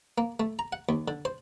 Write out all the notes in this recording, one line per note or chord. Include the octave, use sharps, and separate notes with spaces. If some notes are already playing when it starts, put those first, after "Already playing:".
A#3
A3
A#5
F#5
D#2
D3
C5